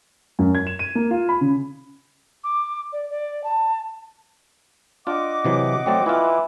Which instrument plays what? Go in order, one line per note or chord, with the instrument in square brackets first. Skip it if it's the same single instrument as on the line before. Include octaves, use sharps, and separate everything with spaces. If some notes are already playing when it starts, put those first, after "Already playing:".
[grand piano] F#2
G#6
E7
D#7
A#3
F4
B5
C#3
[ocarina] D6
D5
D5
A5
[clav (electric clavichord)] D4 F4 [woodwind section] D#5 F#5 D6
[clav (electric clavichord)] C3 E3 F#3
[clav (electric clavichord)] F#3 A3 D5 [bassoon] C4
[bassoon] E3 [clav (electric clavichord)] E4 F4